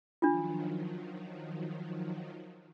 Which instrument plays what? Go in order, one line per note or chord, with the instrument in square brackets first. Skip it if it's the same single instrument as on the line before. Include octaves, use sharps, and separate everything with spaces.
[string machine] D#3 F3 F#3 [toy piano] D4 F4